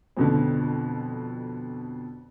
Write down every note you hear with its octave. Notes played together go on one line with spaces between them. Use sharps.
F2 B2 D3